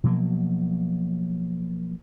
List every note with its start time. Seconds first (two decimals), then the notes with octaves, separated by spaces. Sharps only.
0.04 B2 F3 F#3 A#3